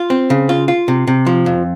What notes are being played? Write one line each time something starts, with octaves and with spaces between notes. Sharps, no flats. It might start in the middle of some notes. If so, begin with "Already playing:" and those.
Already playing: F4
C4
C#3
F4
F4
C3
C3
F3
F2